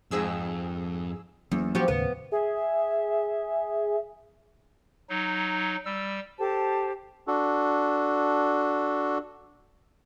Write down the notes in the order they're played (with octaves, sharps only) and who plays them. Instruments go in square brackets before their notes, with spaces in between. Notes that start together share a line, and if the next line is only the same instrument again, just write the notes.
[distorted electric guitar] F2 [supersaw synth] G#2 G#4 E6
[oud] E2 [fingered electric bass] F#3 A#3 C#4
[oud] F3 F#4 G4
[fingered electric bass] D#2 A2 C#3 [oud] B3
[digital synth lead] G#4 [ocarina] E5
[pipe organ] F#3 D#4
G3 E6
[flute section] G4 A4 C5 A5
[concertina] D4 F#4 A4